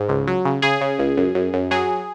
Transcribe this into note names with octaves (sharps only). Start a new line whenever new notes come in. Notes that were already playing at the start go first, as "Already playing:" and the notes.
Already playing: G#2
C#2
F#3
C#3
C#3 G#4
C#3
C#2
F#2
F#2
F#2
F#3 G#4